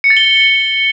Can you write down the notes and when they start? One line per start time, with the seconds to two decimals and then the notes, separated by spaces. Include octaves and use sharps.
0.04 C#7
0.10 A6
0.17 G7